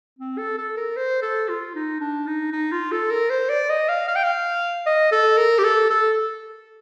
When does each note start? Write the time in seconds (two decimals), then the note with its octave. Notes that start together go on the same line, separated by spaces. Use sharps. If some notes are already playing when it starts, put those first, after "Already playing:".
0.19 C4
0.38 A4
0.58 A4
0.77 A#4
0.97 C5
1.22 A4
1.49 F4
1.75 D#4
2.01 D4
2.27 D#4
2.52 D#4
2.72 F4
2.91 A4
3.11 A#4
3.30 C5
3.49 D5
3.69 D#5
3.89 F5
4.08 F5
4.16 G5
4.24 F5
4.86 D#5
5.12 A4
5.38 A#4
5.58 G4
5.64 A4
5.90 A4